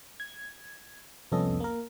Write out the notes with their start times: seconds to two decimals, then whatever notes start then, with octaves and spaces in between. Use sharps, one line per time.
0.20 G#6
1.32 C2 F2 B3 C#4 A4 D#5
1.60 A#3 A#4